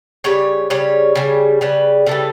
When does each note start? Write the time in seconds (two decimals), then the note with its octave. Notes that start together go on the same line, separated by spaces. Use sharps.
0.24 C#3 G3 C#5
0.70 C#3 G3 C#5
1.15 C#3 G3
1.61 C#3 G3 B4
2.06 C#3 E3 G3 A4